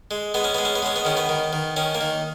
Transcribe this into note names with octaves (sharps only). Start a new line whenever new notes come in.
G#3
G#3 B3
C#4
G#3 B3
C#4
B3
G#3 C#4
B3
D#3 C#4
B3
D#3
D#3
D#3 C#4
A#3
D#3